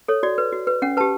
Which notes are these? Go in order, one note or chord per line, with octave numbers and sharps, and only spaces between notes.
A4 C#5
F#4 D5
B4
F#4
B4
C#4 F#5
G4 B4 A5